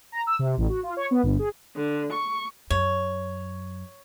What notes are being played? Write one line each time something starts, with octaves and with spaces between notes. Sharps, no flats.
A#5
E6
C3
A1
F#4
F4
C#5
B3
G1
G#4
D3
C#6
F#2 C#5